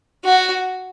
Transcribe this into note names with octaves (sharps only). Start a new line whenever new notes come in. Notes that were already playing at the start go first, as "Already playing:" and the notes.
F#4